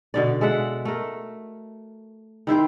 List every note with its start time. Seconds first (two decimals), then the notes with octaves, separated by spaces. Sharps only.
0.14 B2 D3 D5
0.41 G#3 A4 E5 F#5
0.85 A3 A#4
2.47 D#3 E4 C5 G5